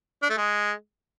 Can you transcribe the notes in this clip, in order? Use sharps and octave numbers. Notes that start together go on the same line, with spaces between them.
D4
A3
G#3